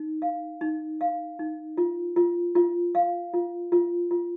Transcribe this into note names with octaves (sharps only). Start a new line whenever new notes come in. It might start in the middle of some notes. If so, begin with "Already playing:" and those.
Already playing: D#4
F5
D#4
F5
D#4
F4
F4
F4
F5
F4
F4
F4